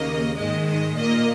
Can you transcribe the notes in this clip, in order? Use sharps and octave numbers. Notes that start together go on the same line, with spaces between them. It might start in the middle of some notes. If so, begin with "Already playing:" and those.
Already playing: D#2 C#3 A#3 D#5
G#2 D#3 G#3 D#5
D#5
A#2 A#3 D#5